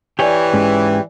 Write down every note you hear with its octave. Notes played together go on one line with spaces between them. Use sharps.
E3 G4 C#5 D5 G#5
G#2 G#3 C#4